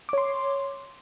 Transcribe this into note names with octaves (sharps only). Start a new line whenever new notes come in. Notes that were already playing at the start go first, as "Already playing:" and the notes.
C#5 C6 D6